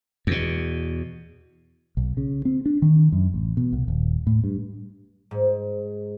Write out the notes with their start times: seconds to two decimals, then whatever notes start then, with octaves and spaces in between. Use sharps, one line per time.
0.27 E2 B2
1.97 B1
2.17 C#3
2.45 C4
2.66 D4
2.82 D#3
3.12 F#2
3.34 A1
3.57 B2
3.73 C2
3.88 D#1
4.27 A2
4.44 G2
5.31 G#2